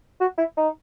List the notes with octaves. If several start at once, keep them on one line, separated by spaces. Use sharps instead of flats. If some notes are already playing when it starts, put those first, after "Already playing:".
F#4
E4
D#4